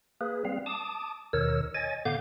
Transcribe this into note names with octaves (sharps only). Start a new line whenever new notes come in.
A#3 G#4 B4
G3 C4 F5
A5 D6 D#6
D#2 B2 D#3 A#4 C#5 E6
C#5 D#5 G#5 A6
A2 D3 B3 F5 D6 G6